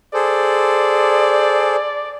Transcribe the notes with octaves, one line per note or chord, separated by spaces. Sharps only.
G#4 A4 C5 D5